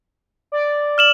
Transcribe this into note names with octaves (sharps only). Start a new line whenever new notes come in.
D5
F6 E7 F#7